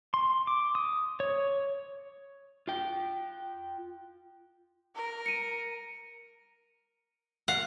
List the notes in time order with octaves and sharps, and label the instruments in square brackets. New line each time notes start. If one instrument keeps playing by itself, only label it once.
[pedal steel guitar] C6
D6
D#6
C#5
[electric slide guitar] F4 G5
[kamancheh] A#4
[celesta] C#7 D#7
[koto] F5 [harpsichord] F#5